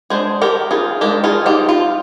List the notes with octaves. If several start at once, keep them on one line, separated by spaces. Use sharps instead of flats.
G#3 D4 G#4 C5
G4 A#4
F4 G#4
G#3 D4 G4 A#4
F4 G#4
D#4 G4
F4